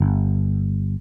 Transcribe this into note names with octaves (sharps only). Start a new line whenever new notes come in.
G1